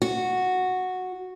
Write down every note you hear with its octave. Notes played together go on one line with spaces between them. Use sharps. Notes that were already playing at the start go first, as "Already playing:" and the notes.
F#4